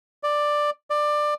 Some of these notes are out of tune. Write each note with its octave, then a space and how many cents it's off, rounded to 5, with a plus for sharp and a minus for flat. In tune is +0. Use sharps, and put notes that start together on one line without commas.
D5 +10
D5 +20